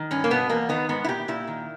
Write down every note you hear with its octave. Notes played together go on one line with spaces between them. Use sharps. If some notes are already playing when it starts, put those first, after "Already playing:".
Already playing: D#3
G2 C#4
A#3
B2 B3
E2 A#3
D#3 B3
G#2 B3
E4
A#2 G4
A#2 E4
D#3